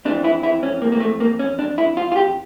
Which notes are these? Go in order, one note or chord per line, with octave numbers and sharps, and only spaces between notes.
F2 E3 D4
E4
E4
C#4
A#3
A#3
A3
A#3
C#4
D4
E4
F4
F4
G4